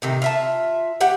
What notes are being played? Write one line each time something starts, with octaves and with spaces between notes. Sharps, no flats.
A2 C3 D#3
F4 E5 A5
A3 G4 F#5